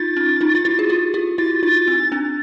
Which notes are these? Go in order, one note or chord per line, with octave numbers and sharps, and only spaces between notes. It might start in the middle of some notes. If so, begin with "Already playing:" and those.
Already playing: D#4 F4 A6
C#4 D#4
D#4 F4
F4
E4 F#4
G#4
F4 G4
F4 G4
E4 F#4 A6
D#4 F4 A6
C4
C4 D4